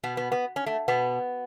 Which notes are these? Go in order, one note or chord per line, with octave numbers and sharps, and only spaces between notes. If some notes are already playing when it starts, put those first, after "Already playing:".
B2 B3
B3
B3
C#4
A3
B2 B3